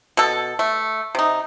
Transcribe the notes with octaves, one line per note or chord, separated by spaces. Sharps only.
B2 A4
A3
C3 D#4